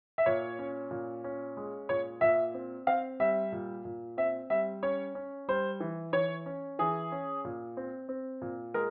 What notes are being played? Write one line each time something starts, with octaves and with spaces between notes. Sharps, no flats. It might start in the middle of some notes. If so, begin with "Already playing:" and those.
E5
A#2 C#5
C#4
A#2
C#4
G#3
A#2 C#5
A#2 E5
C4
C4 F5
G3 E5
A#2
A#2
C4 E5
G3 E5
C#4 C#5
C#4
G3 C5
E3
E3 C#5
C#4
E3 G#4
C#4
A#2
C4
C4
A#2
G#3 A#4